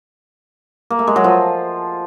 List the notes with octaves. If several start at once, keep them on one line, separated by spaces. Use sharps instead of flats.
A#3
A3
G#3
F#3
F3